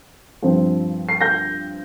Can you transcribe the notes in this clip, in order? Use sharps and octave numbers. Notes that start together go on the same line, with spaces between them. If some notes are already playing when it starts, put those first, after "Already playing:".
G2 F3 C4
C7
G6 A#6